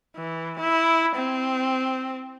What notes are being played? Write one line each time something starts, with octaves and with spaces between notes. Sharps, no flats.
E3
E4
C4